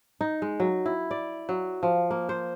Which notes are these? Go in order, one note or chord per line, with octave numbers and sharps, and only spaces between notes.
D#4
G#3
F#3
E4
D5
F#3
F3
A#3
C5